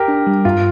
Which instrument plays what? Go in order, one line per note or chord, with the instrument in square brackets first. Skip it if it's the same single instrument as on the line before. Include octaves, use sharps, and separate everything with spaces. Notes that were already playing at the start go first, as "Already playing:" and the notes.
Already playing: [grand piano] G4 A#4
[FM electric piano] D4
G3
[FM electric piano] G2 [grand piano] F4